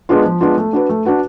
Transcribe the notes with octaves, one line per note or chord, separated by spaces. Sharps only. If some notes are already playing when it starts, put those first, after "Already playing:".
G#3 B3 D4 F4
F3
G#3 B3 D4 F4
A3
D4 F#4 B4
A3
D4 F#4 B4